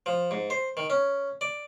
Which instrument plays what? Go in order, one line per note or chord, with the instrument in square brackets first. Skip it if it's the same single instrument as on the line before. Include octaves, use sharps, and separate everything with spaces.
[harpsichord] F3
G#2
C5
D#3
C#4
D5